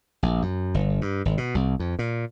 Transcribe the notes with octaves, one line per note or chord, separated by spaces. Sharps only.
A#1
F#2
G1
G2
G#1
B2
C2
F2
A#2